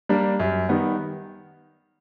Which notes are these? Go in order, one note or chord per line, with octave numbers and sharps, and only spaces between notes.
G3 A#3 D4
F#2
D#3 G3 B3